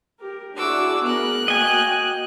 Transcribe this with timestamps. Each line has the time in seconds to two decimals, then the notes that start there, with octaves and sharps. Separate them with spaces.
0.20 G4 A#4
0.57 D4 E4 F#4 G#4 D6 E6
1.06 B3 G#4 A#4 F#6
1.48 A#3 F#4 D#5 G5 G#5